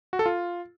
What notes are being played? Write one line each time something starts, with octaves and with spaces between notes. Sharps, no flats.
F#4
A4
F4